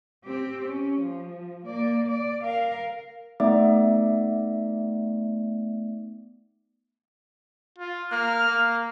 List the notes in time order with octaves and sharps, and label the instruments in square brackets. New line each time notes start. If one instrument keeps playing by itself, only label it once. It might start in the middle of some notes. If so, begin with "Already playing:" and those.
[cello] C4 G4
C#4
F3
A#3 D5
D5
A#4 F5
[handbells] A3 B3 D#4 D5 E5 D6
[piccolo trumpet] F4
[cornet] A#3 [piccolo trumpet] F6
[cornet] A#3